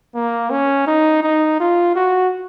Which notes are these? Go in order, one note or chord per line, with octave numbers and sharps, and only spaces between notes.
A#3
C#4
D#4
D#4
F4
F#4